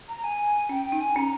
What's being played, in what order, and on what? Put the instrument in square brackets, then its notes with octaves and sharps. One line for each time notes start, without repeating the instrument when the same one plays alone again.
[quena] A#5
G#5
[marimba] C#4 [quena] G5
[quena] G5
[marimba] D#4
[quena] G#5
[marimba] C#4 [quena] A#5